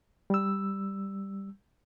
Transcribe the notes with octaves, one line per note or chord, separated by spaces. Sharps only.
G3 E6